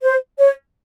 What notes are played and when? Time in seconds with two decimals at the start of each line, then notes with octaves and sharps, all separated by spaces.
0.03 C5
0.39 C#5